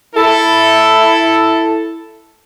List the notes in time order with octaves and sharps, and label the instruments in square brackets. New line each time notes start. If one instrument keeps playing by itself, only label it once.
[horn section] E4 A4